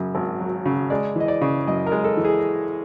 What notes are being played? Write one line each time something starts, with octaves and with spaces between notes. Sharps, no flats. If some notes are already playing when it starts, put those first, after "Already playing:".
Already playing: F#2 C#3
G#1
F#3
C#3
G#3 D5
E3 D#5
D5
C#3
F#2 D#5
A#4
G#3
A4
E3
G#4